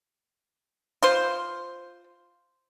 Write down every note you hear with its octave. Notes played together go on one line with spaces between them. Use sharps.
F4 C5